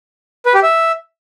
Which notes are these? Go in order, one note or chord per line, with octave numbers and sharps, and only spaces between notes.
B4
G4
E5